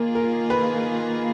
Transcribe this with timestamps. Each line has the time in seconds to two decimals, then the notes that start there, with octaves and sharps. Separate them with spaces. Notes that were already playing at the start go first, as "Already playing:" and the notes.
Already playing: D#3 A#3 F4 G#4 A#4
0.15 A#4
0.50 B4